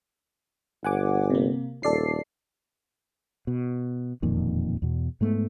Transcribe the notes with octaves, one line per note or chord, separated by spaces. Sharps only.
G1 F#5 G#5 D6
C3 A#3
D#1 A4 D5 C7
B2
E1 F2 A#2 D#3
E2 B2
G#2 G#3 A3 B3